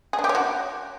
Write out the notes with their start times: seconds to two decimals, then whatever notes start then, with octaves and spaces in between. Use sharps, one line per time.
0.13 G#4
0.19 D4
0.24 G4
0.29 C#5
0.35 F#4